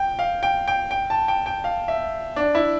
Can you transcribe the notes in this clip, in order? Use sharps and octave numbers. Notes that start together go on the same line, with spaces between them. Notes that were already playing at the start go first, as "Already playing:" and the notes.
Already playing: G5
F5
G5
G5
G5
A5
G5
G5
F5
E5
D4
E4